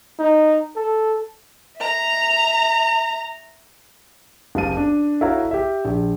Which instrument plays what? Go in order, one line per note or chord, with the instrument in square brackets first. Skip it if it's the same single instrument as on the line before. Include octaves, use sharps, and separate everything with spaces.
[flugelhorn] D#4
A4
[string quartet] E5 A#5
[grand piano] F#1 G4 F5 A5 D#7
D4
E4 F#4 A4 C#5 F5 A#5
G4 E5
A#1